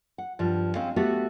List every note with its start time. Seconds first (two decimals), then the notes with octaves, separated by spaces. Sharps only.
0.18 F#5
0.39 G2 F3
0.75 G#3 C4 C#4 F5
0.96 A3 B3 F#4 G4